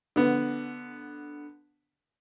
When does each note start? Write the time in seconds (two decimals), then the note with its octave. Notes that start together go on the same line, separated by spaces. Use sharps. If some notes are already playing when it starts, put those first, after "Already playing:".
0.16 D3 B3